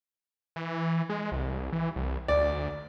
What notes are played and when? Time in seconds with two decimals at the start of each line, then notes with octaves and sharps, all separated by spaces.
0.56 E3
1.09 G#3
1.32 C2
1.73 E3
1.96 C2
2.28 D2 D5